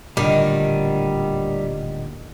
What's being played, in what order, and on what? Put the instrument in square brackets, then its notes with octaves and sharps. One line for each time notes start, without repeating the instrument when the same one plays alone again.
[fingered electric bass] D1 A#2 D3 [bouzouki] D#3 [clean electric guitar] G3